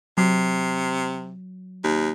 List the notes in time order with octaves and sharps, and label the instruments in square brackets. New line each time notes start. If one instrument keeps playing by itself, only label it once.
[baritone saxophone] C3 [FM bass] F#3
[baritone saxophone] D#2